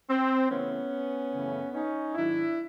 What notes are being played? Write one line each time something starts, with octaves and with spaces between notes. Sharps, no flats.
C4
C#3 E3 A3 B3 C#4
F#2 C#3 E3 A3
C#4 D#4
G#2 D#3 F#3 D4 E4